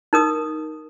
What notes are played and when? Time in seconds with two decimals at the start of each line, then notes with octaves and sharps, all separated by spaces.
0.13 D#4 A#4 D#6